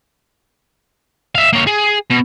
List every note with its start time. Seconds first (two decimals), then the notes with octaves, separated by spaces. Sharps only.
1.35 E5 F5
1.53 A#3 C#5
1.67 G#4
2.10 B2